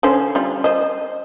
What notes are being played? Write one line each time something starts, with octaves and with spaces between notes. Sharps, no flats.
D3 C#4 C5
G3 F4
C5 D#5